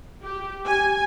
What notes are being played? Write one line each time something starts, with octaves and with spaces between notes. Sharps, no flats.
G4
G#5